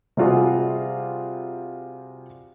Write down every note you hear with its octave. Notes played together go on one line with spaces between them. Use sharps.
C3 G3 F4 F#4 G#4